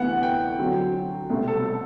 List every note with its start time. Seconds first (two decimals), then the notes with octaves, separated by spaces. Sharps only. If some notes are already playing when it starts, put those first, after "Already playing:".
Already playing: D2 C3 E3 B3 F#5
0.23 G5
0.58 D3 F#3 C4
1.29 C2 B2 A3 C4
1.48 A4
1.66 A4